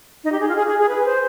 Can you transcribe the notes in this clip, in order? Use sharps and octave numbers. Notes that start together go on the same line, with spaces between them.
D#4
G4
G#4
F4
G#4
G#4
G#4
B4
C5